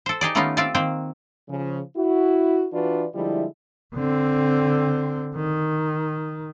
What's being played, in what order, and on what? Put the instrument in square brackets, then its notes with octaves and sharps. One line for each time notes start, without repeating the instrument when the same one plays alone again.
[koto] A4 C5
D#4 G4 G#4 D5
D#3 A3 B3 C#4 D#4 F4
C4 F4 D5 E5 A5
D#3 A#3 C4 C5 G5
[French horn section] C#3 F3
E4 F#4
E3 D4 F4 F#4 B4 D5
D3 F3 G3 G#3 E4
[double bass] D3 C4
D#3